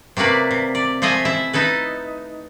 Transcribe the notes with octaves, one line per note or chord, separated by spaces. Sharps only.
C3 A3 A#3 B4 D5
C3
D5
F3 A3 F4 D#5 E5 G#5
E4 E5
D#4 E4 A4 B4